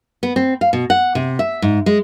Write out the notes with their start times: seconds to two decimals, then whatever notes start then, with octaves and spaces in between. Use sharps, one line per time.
0.23 B3
0.36 C4
0.61 F5
0.73 B2
0.90 F#5
1.15 C3
1.39 E5
1.62 G#2
1.86 G#3